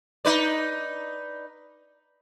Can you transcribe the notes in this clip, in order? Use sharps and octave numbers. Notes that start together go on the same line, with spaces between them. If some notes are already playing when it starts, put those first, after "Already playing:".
D#4 B4 D5